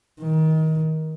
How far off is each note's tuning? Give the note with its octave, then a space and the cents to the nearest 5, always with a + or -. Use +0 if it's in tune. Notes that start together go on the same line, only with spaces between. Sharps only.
D#3 +25